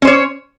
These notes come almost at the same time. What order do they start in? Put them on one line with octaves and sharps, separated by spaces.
C#4 C5 C#5